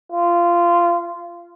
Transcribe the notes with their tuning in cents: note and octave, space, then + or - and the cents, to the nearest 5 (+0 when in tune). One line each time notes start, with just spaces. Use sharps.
F4 -15